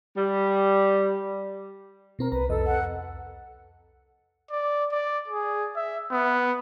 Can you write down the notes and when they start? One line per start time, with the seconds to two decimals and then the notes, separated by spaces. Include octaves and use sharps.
0.17 G3
2.19 B2 C4 A#4 A#5
2.32 C2 B4 A#5
2.49 C2 F2 A4 D#5
2.66 F#5
4.51 D5
4.92 D5
5.28 G#4
5.76 E5
6.11 B3